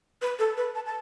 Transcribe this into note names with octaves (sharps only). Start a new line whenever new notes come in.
B4
A4
B4
A5
A5